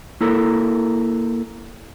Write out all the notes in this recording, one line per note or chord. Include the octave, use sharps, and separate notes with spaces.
A#3 E4 A4 A#4